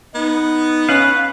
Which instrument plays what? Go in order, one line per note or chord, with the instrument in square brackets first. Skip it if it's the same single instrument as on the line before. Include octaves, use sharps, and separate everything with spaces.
[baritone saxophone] B3 [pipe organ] D#4
[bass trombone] C#4 [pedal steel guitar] B4 F5